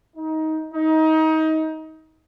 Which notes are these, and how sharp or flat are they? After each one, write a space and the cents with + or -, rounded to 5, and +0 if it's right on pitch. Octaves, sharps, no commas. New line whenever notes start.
D#4 +20
D#4 +25